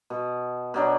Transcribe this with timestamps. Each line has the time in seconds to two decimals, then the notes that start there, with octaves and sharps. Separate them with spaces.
0.10 B2
0.74 B2 F#3 D4